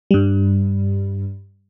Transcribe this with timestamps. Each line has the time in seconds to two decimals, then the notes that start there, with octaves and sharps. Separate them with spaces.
0.11 G2 G3